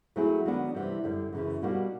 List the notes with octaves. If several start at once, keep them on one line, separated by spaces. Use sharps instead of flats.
F#3 A3 C4 E4 G#4
D#3 F#3 B3 D4
C3 E3 G3
F#2 D3 G3
F#2 C#3 E3
B2 G3 A#3 D#4 F#4